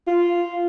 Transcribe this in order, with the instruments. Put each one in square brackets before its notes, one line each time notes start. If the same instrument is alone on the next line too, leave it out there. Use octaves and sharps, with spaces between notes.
[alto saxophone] F4